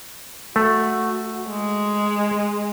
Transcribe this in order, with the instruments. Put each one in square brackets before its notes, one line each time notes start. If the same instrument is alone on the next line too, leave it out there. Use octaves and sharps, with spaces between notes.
[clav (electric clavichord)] A3 [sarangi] F#4
[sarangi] G#3